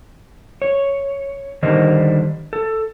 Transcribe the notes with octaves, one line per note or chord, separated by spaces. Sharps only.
C#5
D3 D#3 G3 C5 D#5
A4